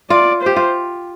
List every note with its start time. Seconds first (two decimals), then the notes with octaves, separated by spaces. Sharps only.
0.10 F4 D5
0.42 G4 C5
0.56 F4